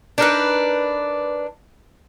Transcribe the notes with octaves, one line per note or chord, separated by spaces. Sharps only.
D4 D#4 A#4 B4